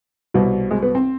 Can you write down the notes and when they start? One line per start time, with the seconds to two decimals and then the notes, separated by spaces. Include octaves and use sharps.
0.34 C2 B2
0.71 G#3
0.83 B3
0.95 C4